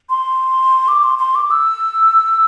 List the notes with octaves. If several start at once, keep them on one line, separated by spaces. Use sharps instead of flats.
C6
D6
C6
C6
D6
E6